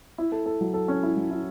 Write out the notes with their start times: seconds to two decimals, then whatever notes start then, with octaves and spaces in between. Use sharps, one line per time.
0.18 E4
0.32 A4
0.46 A4
0.61 F#3
0.74 A4
0.88 C#4
1.03 E4
1.17 F#3
1.31 E4